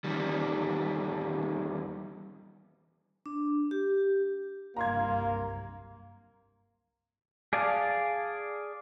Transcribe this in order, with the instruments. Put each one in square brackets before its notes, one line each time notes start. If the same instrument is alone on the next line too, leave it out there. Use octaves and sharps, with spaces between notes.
[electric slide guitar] E2 D#3 G3
[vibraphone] D4
G4
[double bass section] F#1 C2 G2 [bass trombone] A#3 [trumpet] F5 [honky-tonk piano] A#5 C6 G#6
[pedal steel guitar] G#4 D5 F5 A5